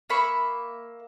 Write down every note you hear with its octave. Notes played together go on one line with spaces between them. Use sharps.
A#3 E5 B5 C#6